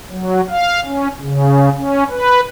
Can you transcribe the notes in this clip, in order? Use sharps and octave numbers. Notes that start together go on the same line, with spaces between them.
F#3
F5
C#4
C#3
C#4
B4